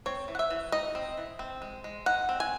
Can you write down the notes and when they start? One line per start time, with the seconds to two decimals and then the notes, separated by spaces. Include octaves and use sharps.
0.06 C4 C#5
0.28 E3
0.35 F#5
0.39 E5
0.50 E3
0.72 D#4 D#5
0.95 C4
1.17 E3
1.39 C4
1.62 G#3
1.84 G#3
2.06 D#4 F#5
2.29 C4
2.40 G#5